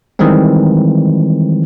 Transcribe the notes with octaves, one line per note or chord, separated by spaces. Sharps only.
D#3 E3 G3 G#3 C4